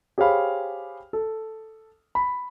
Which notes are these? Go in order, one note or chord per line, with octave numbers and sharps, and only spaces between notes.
G4 G#4 C5 C#5 F5 B5
A4
B5